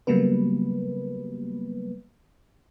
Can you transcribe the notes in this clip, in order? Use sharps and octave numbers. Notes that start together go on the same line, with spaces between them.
C#3 F#3 G3 A#3 B3 B4